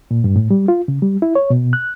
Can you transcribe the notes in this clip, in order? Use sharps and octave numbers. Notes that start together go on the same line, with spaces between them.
A#2
G2
A2
G3
F4
C#3
G3
E4
C#5
B2
F#6